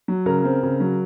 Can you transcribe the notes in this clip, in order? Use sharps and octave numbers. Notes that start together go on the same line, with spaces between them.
F#3
C#3 A#4
C4
C#3
F#3